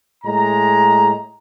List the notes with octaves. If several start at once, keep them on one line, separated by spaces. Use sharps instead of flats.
A2 G#3 A#5